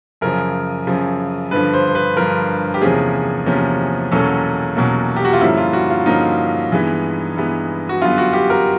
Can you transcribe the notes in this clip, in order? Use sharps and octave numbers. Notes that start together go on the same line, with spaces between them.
F#2 C#3 F3 A#4
F#2 C#3 F3
G2 D3 F3 B4
C5
C5
B4
G2 D3 F3 A#4
G4
E2 C3 F3 A#3 C#4 G#4
E2 C3 F3 A#3 C#4
E2 B2 F#3 A#3 C#4 A4
E2 B2 F#3 A#3 C#4
G4
F#4
F4
G2 D3 F3 A#3 C#4 E4
F4
F#4
F4
G2 D3 F3 A#3 C#4 D#4
G2 E3 G#3 B3
G2 E3 G#3 B3
F#4
F#2 D3 G3 B3 F4
F#4
G4
A#4